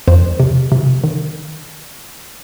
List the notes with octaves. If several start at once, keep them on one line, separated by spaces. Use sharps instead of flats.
F2 C5
C3
C3
D#3